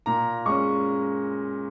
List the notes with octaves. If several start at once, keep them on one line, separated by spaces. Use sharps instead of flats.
A#2 A#5
G#3 C#4 C#6